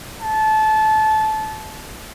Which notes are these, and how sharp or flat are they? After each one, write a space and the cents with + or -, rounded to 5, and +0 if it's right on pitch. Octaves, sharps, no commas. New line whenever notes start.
A5 -20